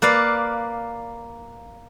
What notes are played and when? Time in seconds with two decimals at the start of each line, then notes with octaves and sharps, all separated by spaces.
0.02 A#3 B4 D5 F5